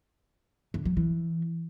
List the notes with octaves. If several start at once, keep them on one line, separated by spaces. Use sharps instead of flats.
D3
F#3
E3